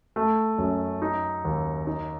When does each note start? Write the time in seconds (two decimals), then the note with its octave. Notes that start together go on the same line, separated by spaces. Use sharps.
0.16 A3
0.58 F#2
1.02 D#4
1.45 D#2
1.87 D#4